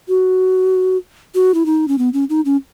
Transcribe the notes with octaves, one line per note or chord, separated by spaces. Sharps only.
F#4
F#4
E4
D#4
C#4
B3
C#4
D#4
C#4